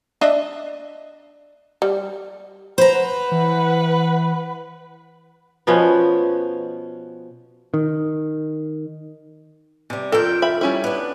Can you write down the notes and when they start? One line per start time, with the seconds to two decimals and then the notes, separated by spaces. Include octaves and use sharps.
0.21 D4 D#5 E5
1.82 G3
2.78 B4 C5 F#5 A#5
3.31 E3
5.67 B2 F3 B3 C#4
7.74 D#3
9.90 C3 G3
10.12 F2 A4 A#4 G5
10.42 E5 B5
10.61 G3 C#4 E4
10.84 B3 D4